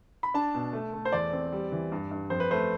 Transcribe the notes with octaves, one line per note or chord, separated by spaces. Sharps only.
B5
D4 A5
B2
A3
A3
C5
E2 D5
C4
G3
E3
G2
G2
F2 C5
B4
A3 C5